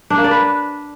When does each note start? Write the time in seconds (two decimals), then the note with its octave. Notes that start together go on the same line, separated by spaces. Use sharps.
0.10 D4
0.17 A#3
0.24 D5
0.31 B4